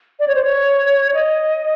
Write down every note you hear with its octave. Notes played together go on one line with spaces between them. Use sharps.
D5
C#5
C5
C#5
D#5